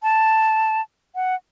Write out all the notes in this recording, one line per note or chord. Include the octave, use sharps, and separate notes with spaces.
A5
F#5